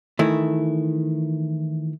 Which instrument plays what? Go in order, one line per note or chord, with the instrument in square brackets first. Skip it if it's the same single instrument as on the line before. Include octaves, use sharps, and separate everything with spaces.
[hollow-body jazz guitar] D#3 E3 A3 E4